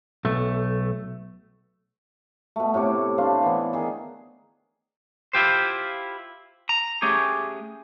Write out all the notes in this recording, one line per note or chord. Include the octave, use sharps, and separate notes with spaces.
B1 A3
B2 A3
A2 C3 C#5 D6
D4 C5 D5 F5
E3 B3
D#3 G#4
E4 F4 G4 C5
A#5
A3 C#4 G4 G#4